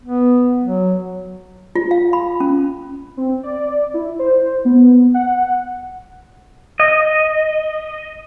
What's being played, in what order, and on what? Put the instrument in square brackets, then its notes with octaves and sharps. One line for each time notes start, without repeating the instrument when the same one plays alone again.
[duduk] B3
F#3
[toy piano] F4
F5
B5
C#4
[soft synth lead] C4
D5
E4
C5
B3
F#5
[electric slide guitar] D#5